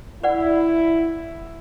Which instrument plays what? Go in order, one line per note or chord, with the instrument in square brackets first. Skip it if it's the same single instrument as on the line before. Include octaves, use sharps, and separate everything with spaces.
[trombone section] E4 [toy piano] B4 D5 F#5